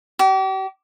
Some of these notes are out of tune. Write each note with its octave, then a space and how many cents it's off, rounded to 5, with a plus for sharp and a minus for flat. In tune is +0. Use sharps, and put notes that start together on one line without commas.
G4 -40